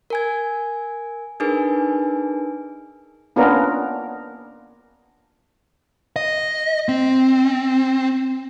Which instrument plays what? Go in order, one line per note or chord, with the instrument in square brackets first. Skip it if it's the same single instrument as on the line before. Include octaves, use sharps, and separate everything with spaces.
[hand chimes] A#4 G#5 G#6
D4 D#4 G#4 A#4 B4 G#5
[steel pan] A#3 B3 C#4 D4 F4 A#4
[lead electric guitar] D#5
C4